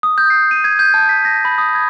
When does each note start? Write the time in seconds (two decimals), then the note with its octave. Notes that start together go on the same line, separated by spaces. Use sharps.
0.03 D#6
0.18 G6
0.30 C7
0.51 D#7
0.64 G#6
0.79 G6
0.94 A5
1.09 B6
1.25 A#6
1.45 B5
1.58 D#6
1.75 G#6